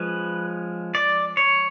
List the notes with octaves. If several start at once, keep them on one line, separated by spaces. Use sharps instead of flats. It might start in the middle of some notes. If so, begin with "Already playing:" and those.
Already playing: F3 G#3 C#4 B4
D5
C#5